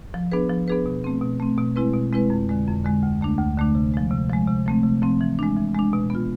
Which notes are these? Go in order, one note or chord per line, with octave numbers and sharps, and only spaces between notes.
F3
B3 D4 G#4 B4
F3
B3 D4 G#4 B4
B2
A3 C4
B2
A3 C4
B2
G#3 C4 E4 B4
B2
G#3 C4 E4 B4
F2
D3 G#3
F2
D3 G#3
D2
D3 A3 D4
D2
D3 A3 D4
C3
F3 G#3
C3
F3 G#3
C3
F3 A3 C4
C3
F3 A3 C4
E3
G#3 D4
E3
G#3 D4
B2
B3 F4